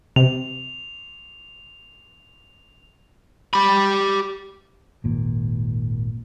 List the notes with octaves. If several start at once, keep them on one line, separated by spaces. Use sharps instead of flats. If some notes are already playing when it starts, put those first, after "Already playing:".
C3 F7
G4 B5
G#1 D#2 A#2